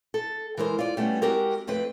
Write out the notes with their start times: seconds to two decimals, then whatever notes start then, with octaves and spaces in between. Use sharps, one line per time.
0.14 A4
0.57 E3 G#3 A#4 C5
0.79 F4 D5
0.97 G3 A3 B3 C#4
1.22 G#3 C4 F#4 G4 A#4
1.67 F2 A3 C4 B4